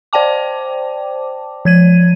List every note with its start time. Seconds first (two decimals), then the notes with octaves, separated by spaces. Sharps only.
0.13 C5 D5 G5 A5 D6
1.65 F3 G#6 D#7